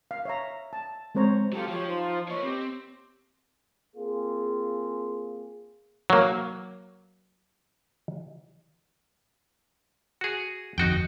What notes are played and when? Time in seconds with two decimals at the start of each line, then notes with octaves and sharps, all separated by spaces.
0.11 F5
0.25 C#5 E5 A#5
0.73 A5
1.15 G#3 C4 C5 C#5 A#5
1.52 F#3 F4 G4 A4
1.68 F3 G4 C#5
1.87 D#4 F4 C5
2.28 A#3 B4 C#5 D#5 C#6
2.43 C4 G4
3.96 A#3 C4 F4 G#4
6.10 F#3 A#3
10.21 F#4 G#4
10.78 G1 F2 D#4 F#4 G5